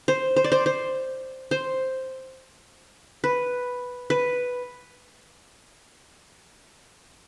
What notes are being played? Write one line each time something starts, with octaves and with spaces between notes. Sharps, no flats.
C5
C5
D5
C5
C5
C5
B4
B4